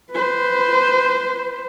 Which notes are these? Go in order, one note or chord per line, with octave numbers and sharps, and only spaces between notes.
B4 C5